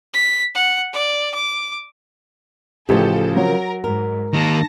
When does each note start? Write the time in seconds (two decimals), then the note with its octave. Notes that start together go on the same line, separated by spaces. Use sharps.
0.14 B6
0.55 F#5
0.93 D5
1.34 D6
2.89 A1 C#3 F3 G4 A4
3.37 F#3 A#4
3.84 G#2 A#4
4.33 D#3 A#3 A5 A#6